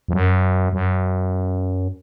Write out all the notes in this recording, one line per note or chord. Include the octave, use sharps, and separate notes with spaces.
F2
F#2
F#2